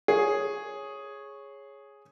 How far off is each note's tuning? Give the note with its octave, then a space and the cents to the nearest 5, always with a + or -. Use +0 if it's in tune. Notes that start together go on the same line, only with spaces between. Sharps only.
G#4 +0 C#5 -5